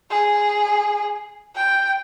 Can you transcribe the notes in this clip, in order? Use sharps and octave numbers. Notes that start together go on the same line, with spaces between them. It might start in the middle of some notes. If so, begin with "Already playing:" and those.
G#4
G5